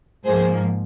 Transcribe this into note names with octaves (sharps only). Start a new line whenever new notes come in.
G#2 F3 A#3 G#4 C5